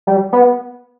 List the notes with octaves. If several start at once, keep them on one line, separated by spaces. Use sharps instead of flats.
G3
B3